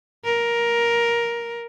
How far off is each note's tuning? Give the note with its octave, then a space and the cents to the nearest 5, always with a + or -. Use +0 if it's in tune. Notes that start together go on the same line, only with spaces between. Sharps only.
A#4 +10